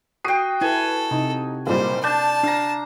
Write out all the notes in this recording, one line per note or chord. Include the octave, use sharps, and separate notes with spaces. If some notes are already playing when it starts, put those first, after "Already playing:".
F#4 G5 D#6 C7 D#7
E4 A4 B4 G#5
C3 D#4
F#1 A#2 G3 C5
D4 A5 G6 A6
D4 F5 A#5